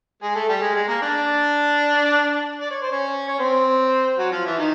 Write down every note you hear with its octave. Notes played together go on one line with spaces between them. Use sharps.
G#3 G#4
A3 A4
G3 G4
G#3 G#4
G#3 G#4
A#3 A#4
D4 D5
D5
C#5
C5
C#4 C#5
C#5
C4 C5
F#3 F#4
F3 F4
E3 E4
D#3 D#4